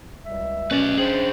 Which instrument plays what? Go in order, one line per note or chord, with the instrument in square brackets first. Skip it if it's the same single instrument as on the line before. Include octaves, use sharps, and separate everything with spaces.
[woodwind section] C#2 G3 E5
[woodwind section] B2 F#3 A3 [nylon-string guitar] C#4 [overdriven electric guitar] B4 D5
[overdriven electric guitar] D4 G#4 [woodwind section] C5 G5